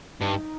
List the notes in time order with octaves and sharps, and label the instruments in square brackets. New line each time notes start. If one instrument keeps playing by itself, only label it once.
[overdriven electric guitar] G2 [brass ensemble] D#4